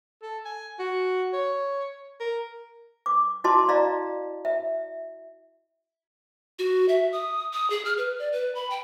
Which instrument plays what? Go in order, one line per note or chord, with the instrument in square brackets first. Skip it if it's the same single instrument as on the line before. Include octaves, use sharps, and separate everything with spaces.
[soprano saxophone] A4
G#5
F#4
C#5
A#4
[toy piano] D6
E4 F#4 D#5 A5 C6 D6
D5 D#5 F5 A#5
E5
[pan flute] F#4
E5
D#6
D#6
G#4
F6
B4
D5
B4
B5
G5